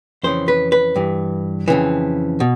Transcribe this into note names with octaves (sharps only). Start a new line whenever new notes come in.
F2 C#3 E3 C5
B4
B4
G2 E3
F2 C#3 E3
B2